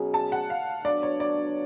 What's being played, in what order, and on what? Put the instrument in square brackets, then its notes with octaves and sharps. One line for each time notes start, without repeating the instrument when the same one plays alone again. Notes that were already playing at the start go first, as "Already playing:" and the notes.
Already playing: [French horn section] B2 F#3 C#4 G#4
[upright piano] A5
F#5
F5
[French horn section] F#3 B3 D4 [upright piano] D5
[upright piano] C#5
D5